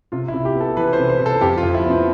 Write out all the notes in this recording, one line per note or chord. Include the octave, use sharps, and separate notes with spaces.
C3 F4
E4
C3
G4
B3
A4
E3 B4
C5
C3
C5
C3
A4
F2 G4
F4
F2
E4
B3 C4